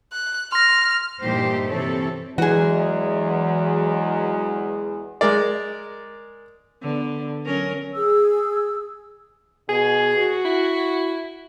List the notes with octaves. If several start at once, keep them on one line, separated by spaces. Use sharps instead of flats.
F#6
C6 F6 A#6
G2 A#2 E3 D#4 G4 C5
C3 E3 C4 A4 C#5
E2 E3 F#3 G#3 F#4 G#4
G#3 A#4 D5
D3 B3
F#3 C#4 A#4
G#4 E6
B2 G#4
F#4
E4